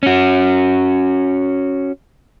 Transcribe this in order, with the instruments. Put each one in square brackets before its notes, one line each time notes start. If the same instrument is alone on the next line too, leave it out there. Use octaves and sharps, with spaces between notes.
[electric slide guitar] C#4 F#4